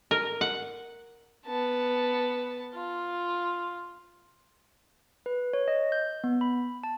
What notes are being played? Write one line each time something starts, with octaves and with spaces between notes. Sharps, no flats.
A#4
F#5
B3 A5
F4
B4
C#5
D#5
G6
B3
B5
A5